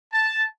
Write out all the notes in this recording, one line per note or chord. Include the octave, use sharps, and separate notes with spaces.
A5